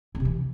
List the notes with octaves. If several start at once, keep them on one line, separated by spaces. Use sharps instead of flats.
C4
C3
E3